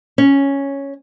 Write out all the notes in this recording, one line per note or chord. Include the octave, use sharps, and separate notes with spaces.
C#4